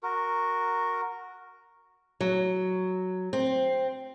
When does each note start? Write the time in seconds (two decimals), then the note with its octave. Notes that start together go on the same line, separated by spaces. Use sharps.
0.03 F#4 A#4
2.21 F#3
3.33 C4